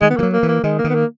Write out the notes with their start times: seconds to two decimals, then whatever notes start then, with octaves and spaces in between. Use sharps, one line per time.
0.01 D#3 G#3
0.10 B3
0.17 E3 A#3
0.23 F#3
0.33 A#3
0.43 E3
0.48 A#3
0.64 D#3 G#3
0.79 A#3
0.84 D#3
0.90 B3
0.95 A#3